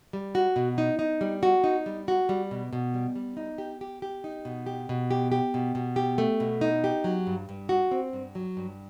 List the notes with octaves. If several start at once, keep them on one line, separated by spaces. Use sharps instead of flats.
G3
F#4
B2
D#4
D#4
G3
F#4
D#4
G3
F#4
G3
B2
B2
G3
G3
D#4
G4
G4
G4
D#4
B2
G4
B2
G4
G4
B2
B2
G4
A3
B2
D#4
G4
F#3
G2
G2
F#4
C4
G2
F#3
G2